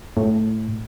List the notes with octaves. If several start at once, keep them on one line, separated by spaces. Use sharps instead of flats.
A2